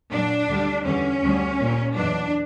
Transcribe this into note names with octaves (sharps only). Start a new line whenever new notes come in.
A#2 F#3 D4
D2 D3 G3
E2 D3 G3 C#4
D2 D3 G3
A#2 G3
E2 B2 F#3 D4